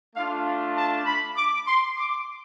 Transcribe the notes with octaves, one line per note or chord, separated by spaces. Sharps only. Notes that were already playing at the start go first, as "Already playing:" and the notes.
A3 D4 F4 F5
A5
B5
D6
C6
D6